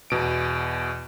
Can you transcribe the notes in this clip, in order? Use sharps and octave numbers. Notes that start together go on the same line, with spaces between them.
E2 B2 D7